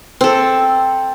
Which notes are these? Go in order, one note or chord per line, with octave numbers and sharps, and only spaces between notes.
C4 A4